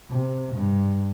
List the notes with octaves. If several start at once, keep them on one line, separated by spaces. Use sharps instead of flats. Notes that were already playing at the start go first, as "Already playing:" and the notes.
C3
G2